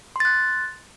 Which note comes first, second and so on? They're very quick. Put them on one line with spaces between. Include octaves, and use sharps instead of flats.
C6 A6 F#6